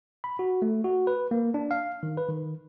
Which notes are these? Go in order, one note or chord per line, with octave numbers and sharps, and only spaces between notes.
B5
F#4
A3
F#4
B4
A#3
D4
F5
D#3
B4
D#3